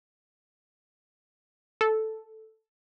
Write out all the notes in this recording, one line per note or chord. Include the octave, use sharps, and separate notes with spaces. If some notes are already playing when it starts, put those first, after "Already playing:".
A4